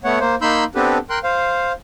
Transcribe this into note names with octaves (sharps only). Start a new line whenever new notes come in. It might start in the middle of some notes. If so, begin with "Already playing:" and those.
A3 B3 C#5 F#5
A#3 C5
A#3 D#4 B5 C6 E6 G6
B3 C4 D4 G4 A4 B4
A#4 G5 C6 F#6
C5 F5